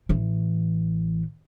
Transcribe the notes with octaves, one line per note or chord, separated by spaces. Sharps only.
A1 E3